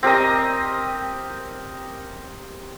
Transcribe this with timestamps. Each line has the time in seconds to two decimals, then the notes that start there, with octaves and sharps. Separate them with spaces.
0.03 C4 G4 A#4 D#5